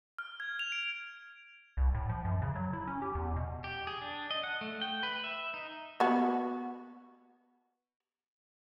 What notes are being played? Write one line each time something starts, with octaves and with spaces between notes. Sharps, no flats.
F6
G#6
F7
D7
C2
A2
F3
F#2
C#3
F#3
E4
C#4
G4
E2
B2
G4
G#4
D4
D#5
F#5
A3
G5
B4
E5
D#4
B3 F#4